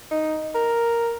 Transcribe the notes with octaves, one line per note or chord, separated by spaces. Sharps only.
D#4
A#4